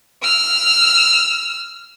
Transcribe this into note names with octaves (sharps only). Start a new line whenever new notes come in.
E6 F6